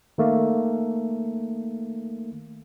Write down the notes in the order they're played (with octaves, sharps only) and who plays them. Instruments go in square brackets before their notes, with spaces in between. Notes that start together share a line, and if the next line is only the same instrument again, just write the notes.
[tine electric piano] D#3 A3 A#3